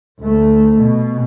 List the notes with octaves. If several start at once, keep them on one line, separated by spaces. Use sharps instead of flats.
D2 A3
B2